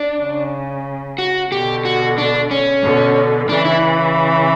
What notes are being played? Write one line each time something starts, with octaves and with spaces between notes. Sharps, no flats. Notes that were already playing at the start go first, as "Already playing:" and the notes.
Already playing: D4
C#3
F#4
B2 D3 G4
F#4
D4
C#4
B2 D3
C#3 E3 D4
E4